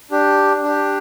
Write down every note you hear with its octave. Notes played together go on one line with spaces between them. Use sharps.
D4 G4
D4 G4